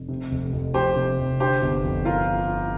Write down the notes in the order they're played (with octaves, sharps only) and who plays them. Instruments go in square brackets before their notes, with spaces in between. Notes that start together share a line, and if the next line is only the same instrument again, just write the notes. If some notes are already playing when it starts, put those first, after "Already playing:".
Already playing: [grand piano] F1
C3
F1
F2
[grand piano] F1 [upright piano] G4 C5
[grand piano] C3
F1
[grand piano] D3 [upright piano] G4 C5
[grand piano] G1
F2
[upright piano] F4 A#4